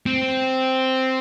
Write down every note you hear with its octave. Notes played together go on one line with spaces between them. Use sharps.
C4